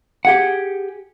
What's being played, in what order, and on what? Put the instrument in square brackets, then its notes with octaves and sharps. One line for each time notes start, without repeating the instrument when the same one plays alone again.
[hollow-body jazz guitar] G4 G#4 F#5